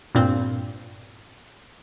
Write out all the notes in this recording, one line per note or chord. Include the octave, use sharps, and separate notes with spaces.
G2 A#2 C4